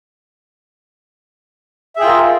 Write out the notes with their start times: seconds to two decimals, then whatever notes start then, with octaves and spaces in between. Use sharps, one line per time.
1.96 E5
1.98 G#4
2.01 G5
2.04 F4
2.06 A#4